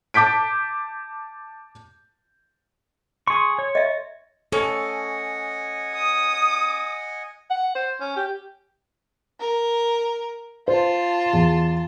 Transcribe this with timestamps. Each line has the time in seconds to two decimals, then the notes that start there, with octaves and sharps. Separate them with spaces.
0.14 A5 D6 G6 B6 D7
3.27 G#4 C6 C#6
3.59 C#5
3.75 D#5 E5
4.52 C#4 A4 D#5 F#5 G#5
5.95 D#6
7.50 F#5
7.75 C5
8.00 C#4
8.16 G4
9.40 A#4
10.68 F4 C5 A5
11.33 E2